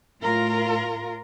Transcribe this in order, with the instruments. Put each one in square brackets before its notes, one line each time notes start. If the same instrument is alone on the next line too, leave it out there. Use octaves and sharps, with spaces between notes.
[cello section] A2 F4 A#4